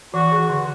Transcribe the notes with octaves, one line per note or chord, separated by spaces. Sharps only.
E3 F#4
G#4
D3